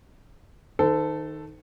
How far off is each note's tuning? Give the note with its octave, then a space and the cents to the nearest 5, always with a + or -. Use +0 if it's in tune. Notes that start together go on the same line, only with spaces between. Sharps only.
D#3 +0 A4 +0 C5 -40